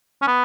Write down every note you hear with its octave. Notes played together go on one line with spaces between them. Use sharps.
C#4
B3